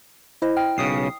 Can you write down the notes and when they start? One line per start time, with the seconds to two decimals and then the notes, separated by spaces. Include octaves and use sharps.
0.42 E4 C5 D#5
0.57 G5 F6
0.78 B1 C#3 D#6 C7